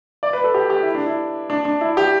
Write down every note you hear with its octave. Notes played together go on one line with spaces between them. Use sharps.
D5
B4
A4
G4
G4
E4
D4
E4
D4
D4
E4
G4